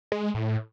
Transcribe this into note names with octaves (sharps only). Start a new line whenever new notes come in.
G#3
G#3
A2